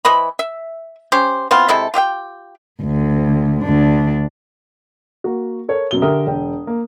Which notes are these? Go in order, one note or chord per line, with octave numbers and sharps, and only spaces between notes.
E3 C5 D#5 B5
E5
C#4 G4 C5
B3 C4 E4 F4
C3 G#3 E4 A4
F4 G4 E5 G5
D2
D2 D4
A#3 F#4
A4 A#4 C#5
F#2 B2 G7
D3 G4 A#4 E5 D#6
E1 G5
A#3